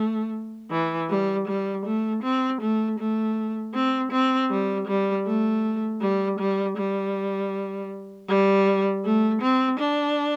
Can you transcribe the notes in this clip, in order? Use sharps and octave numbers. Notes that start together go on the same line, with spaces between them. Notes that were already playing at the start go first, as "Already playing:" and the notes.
Already playing: A3
E3
G3
G3
A3
C4
A3
A3
C4
C4
G3
G3
A3
G3
G3
G3
G3
A3
C4
D4